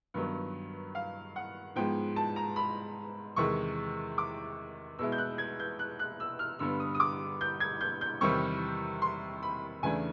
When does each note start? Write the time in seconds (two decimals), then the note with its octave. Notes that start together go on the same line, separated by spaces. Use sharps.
0.14 G2 D#3 F#3 B3
0.95 F5
1.36 F#5
1.76 G#2 F3 G#3 B3 G5
2.16 A5
2.36 A#5
2.56 B5
3.36 E2 C3 D#3 G#3 C#6
4.18 D6
4.99 B2 G#3 B3 E4 E6
5.12 G6
5.18 F#6
5.38 G#6
5.60 G6
5.79 F#6
5.99 F#6
6.20 E6
6.39 F6
6.59 G2 D3 G3 B3 E6
6.80 D#6
6.95 D#6
7.00 D6
7.41 G6
7.60 G#6
7.81 G6
8.01 G6
8.21 E2 C3 D#3 G3 C4 C#6
9.02 C6
9.43 B5
9.83 E2 C#3 E3 A3 D4 G#5